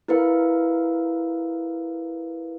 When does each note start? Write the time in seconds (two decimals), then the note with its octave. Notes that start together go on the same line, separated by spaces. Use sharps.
0.08 E4 A#4 B4 F5